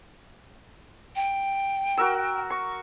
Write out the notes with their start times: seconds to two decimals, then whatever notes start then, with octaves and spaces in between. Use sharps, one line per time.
1.16 G5
1.97 F#4 A#4 E6
2.50 C#6